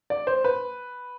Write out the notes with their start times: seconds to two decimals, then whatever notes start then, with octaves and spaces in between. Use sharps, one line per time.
0.10 D5
0.27 C5
0.44 B4